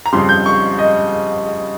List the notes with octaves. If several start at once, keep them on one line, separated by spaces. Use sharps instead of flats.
A#5
F2 C#3 G3 C6
G6
C#6
D#5